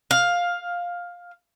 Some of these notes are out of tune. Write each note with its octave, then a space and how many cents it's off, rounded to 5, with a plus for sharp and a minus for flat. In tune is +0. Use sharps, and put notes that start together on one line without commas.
F5 +10